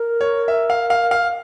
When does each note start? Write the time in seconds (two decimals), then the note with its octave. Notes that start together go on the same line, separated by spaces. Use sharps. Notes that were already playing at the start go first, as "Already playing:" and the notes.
Already playing: A#4
0.21 C#5
0.48 E5
0.70 F5
0.90 F5
1.11 F5